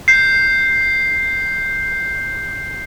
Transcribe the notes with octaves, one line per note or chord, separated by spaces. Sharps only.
G6 C7